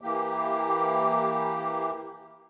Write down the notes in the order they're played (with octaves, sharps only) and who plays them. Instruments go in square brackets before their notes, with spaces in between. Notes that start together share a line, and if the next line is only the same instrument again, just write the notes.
[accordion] E3 A#3 G4